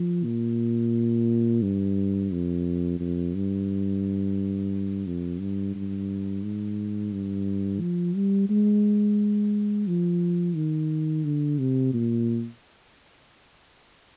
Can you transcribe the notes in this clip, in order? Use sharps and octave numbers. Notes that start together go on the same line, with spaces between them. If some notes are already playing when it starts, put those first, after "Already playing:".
Already playing: F3
A#2
G2
F2
F2
G2
F2
G2
G2
G#2
G2
F3
G3
G#3
F3
D#3
D3
C3
A#2